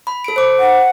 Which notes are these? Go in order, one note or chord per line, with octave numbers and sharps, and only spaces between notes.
B5
A4 D7
C5 D6
F#5